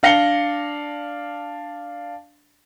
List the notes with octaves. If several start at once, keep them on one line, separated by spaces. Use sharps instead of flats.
D4 F5 A#6 C#7 G7